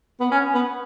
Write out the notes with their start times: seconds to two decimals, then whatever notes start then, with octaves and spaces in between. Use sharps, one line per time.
0.20 B3
0.32 C#4
0.54 B3